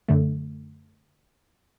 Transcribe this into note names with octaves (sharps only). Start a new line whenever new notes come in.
F#2 D3 A3